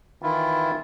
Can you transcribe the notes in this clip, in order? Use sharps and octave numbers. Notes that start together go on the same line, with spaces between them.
D#3 E3 E4 F4